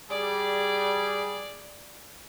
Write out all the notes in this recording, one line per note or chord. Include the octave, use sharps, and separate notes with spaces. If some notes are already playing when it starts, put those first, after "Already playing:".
G3 G#4 D5